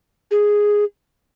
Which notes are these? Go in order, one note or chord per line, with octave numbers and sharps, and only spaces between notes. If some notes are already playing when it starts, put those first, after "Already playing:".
G#4